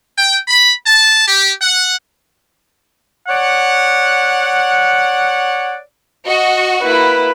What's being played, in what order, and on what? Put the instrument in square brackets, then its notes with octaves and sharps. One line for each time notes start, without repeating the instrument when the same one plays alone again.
[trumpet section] G5
B5
A5
G4
F#5
[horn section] C#5 D5 F#5
[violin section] F#4 [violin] D#5
[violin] A#3 E4 [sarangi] B4